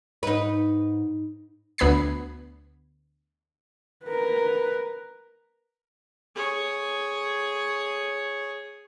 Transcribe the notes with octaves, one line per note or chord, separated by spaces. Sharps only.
G#2 D#4 B4
D2 B3 B5 G#6 C7
A#4 B4
G#4 C#5